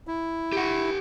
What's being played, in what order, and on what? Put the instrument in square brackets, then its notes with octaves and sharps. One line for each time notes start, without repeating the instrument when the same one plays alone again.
[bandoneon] E4
[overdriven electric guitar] G4 F#5